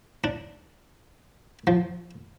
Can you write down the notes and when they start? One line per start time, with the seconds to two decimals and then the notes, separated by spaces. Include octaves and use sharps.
0.24 D4
1.67 F3